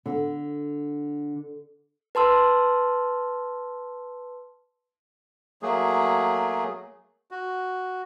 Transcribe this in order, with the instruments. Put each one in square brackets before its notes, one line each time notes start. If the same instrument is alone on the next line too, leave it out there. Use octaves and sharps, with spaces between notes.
[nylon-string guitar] D3
[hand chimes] B4 A5 C6 E6
[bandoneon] F#3 A3 A#3 G#4
F#4